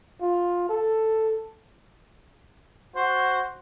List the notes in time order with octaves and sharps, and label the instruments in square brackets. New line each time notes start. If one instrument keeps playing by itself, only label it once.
[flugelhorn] F4
A4
[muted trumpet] F#4 [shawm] C5